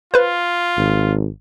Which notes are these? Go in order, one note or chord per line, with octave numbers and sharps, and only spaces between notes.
F4 B4 C5
G#1